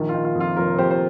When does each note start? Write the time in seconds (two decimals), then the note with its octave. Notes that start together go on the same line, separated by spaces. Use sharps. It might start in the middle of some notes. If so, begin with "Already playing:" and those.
Already playing: A#1 D#3
0.09 F4
0.14 D#3
0.24 F4
0.35 F2
0.40 F4
0.56 F1 F4 A#4
0.78 F2 G4 C5
0.91 C5